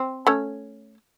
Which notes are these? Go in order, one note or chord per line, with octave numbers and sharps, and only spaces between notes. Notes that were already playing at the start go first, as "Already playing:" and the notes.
Already playing: C4
A3 C#4